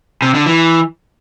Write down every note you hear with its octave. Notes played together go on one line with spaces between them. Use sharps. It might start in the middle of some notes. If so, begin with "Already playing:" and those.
C3
D3
E3